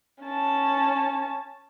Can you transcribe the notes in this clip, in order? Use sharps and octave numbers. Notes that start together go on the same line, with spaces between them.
C#4 A5